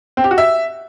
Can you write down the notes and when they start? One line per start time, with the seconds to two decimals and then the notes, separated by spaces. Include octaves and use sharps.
0.17 C4
0.24 G4
0.31 F#4
0.38 E5